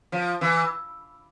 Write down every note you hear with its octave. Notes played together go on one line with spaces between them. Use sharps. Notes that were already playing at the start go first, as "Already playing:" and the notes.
F3
E3